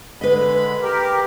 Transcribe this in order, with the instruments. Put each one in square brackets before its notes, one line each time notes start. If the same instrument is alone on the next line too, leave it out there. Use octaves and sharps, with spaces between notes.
[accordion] D3 G#3 B5 [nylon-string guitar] B4 D#5
[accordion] G4 A#4